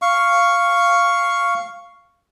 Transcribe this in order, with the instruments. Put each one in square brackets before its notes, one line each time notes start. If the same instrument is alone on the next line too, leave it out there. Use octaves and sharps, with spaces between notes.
[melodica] F5 C#6